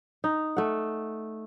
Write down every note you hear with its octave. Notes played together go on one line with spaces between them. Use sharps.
D#4
A3 F#5